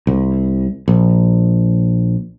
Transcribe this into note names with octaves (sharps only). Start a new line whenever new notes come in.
C2
A#1